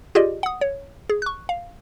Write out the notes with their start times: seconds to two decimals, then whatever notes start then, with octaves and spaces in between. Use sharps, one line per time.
0.15 F4 G4 G#4 D5 D#5
0.43 F#5 D#6
0.61 C#5
1.10 G#4
1.22 C#6 F#6
1.49 F5